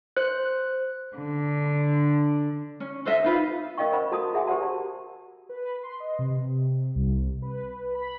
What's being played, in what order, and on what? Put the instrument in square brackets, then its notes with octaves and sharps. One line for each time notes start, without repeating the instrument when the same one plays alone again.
[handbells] C5 F#6
[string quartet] D3
[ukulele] C#4
A4 C5 D#5 E5
D#4 F4 B4 F5
[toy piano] C#4 A#4 D#5 F5 G5 C#6
A#4 C5 F#5 B5
F#4 A4 A5 D#6
F#4 G#4 E5 F#5 G#5
G4 A#4 C5 F#5 A5
A5
[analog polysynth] B4
C6
D#5
C3
C2
B4
B5